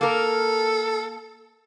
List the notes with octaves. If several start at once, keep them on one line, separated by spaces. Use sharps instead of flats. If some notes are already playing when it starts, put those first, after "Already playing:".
A#3 A4 A#4